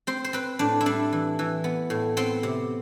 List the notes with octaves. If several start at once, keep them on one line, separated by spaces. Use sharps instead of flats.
C4 C5
C5
C4 B4
A2 D4
E4
G3 D4
E3
E3
B3
A2
B3 C4
C3